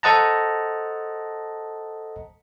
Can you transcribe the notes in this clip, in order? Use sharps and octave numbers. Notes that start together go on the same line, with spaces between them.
A4 C5 D#5 F#5 A5 A#5